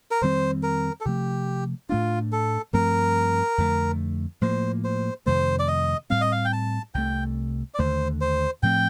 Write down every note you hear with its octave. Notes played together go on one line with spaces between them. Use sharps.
A#4
F2 D#3 G3 C4 C5
A#4
A4
C3 F3 A3 G4
A2 A3 D4 F4
A4
G2 F3 A3 C4 A#4
F2 D3 A3
A2 F3 A#3 C5
C5
F2 C3 D#3 A3 C5
D5
D#5
A2 G3 C4 F5
D#5
F5
G5
A5
C2 C3 D#3 A3 G5
D5
D#2 D3 A3 C5
C5
A2 F3 A3 C4 G5